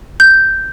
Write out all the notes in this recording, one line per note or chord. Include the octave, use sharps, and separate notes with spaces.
G6